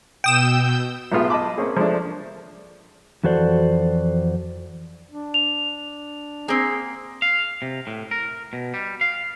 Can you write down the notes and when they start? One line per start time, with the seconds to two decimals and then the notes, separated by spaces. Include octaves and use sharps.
0.24 B2 G5 D#6 E6 G6 E7
1.12 B1 A2 B3 F4 G#4
1.30 D#5 A5 B5 D6
1.58 A#3 C4 C#4 G#4
1.77 F3 G#3 A3 D4
3.23 F2 E3 F#4 A4 C5 D5
5.11 D4
5.34 F7
6.48 A#3 C4 G#4
7.22 F5
7.62 C3
7.87 A2
8.11 A#4
8.53 B2
8.74 G3
9.01 F5